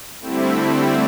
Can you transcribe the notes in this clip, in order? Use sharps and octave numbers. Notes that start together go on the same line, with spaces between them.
D3 G3 A3 C4 E4